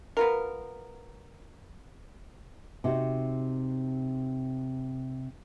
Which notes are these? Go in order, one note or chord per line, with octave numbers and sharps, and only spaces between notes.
B3 F4 A#4
C3 D#4 F#4